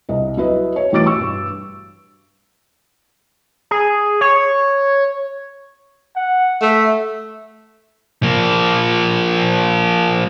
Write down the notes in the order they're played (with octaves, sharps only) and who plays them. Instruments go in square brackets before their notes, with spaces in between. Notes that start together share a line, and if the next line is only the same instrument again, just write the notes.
[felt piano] C2 D#5
F#3 E4 B4 D#5
C#5
A1 G3 F#4 D6 A6 D7
C#6 E6
G2
[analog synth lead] G#4
C#5
[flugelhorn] F#5
[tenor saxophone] A3 [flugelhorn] E5
[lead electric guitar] F3 A#3